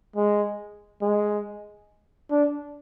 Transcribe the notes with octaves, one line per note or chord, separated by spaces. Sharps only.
G#3
G#3
D4